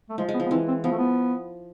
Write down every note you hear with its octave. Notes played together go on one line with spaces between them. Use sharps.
A3
F3 G#3
G#3
B3
F3
B3
E3 C4
C4
F3 B3
A3
B3